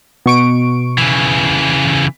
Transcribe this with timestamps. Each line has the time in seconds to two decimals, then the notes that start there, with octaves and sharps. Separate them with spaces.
0.26 B2 C#6 D7
0.98 C#3 E3